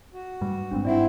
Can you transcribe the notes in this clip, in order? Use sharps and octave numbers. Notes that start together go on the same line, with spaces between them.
F#4
G2 G3
G#1 G#2 C4 D4
G#2 C4 E4 D5 E5 F#5